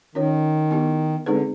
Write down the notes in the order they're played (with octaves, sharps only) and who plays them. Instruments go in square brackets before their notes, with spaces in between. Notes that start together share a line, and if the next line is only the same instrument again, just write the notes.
[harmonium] D#3 [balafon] C#4 F4 A#4 C#5
[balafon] B3 E4 G4
[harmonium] D3 [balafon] G#3 C4 D#4 G#4 B4